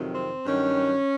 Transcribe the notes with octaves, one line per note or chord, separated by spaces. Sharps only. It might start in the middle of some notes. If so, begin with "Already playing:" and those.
Already playing: F2 C3 D#3 F#3
C4
G2 D#3 F#3 C#4